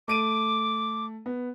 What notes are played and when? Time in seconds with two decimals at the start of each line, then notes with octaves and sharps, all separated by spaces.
0.08 A3 D6 D7 D#7
1.26 B3